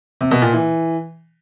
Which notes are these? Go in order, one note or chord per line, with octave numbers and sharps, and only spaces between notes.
C3
B2
A#2
E3